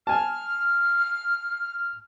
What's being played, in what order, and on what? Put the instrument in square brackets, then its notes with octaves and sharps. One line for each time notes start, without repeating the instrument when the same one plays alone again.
[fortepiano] G#5 A5 [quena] F6